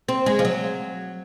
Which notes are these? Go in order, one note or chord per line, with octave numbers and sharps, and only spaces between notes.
C4
G#3
F3
F#3